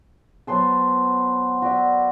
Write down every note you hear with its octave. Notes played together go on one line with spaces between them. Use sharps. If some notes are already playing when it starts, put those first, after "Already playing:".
F#3 B3 C5 A5
F#4 D5 E5